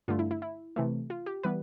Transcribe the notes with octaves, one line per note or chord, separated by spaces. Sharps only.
G2 D3 A3 F4
E4
E4
E4
C3 E3 A3
F4
G4
E3 G3 B3 B4